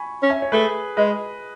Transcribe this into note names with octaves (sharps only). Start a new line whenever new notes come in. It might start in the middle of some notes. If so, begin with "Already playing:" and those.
Already playing: G#5 B5 C#6
C#4
E5 G#5
C#5
A3 G#4 B4
G#3 B4 D#5